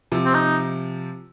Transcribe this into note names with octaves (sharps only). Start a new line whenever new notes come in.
C3 F3
C4
D#4